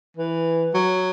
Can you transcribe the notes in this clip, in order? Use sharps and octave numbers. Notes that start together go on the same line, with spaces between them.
E3
F#3